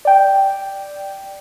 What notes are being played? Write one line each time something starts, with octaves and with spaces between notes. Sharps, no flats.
D5 G5